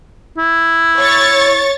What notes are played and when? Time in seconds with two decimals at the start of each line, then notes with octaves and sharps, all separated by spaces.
0.38 E4
0.98 C#5 C#6 A6